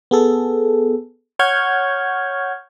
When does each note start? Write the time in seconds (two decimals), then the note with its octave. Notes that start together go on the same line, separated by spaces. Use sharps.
0.11 B3 G#4 A4
1.39 C#5 F#5 C#6 F6 G6 G#6